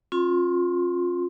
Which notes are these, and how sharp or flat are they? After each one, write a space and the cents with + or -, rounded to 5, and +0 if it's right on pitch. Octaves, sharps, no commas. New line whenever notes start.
C#4 -40 F4 +20 C6 +0